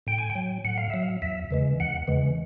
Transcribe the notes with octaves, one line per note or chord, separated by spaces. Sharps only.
A2 G5
G#5
G5
F#3
A2 F#5
F5
F#3 E5
F5
E2 E5
C#3 E3 G#3
E2 F#5
C#3 E3 G#3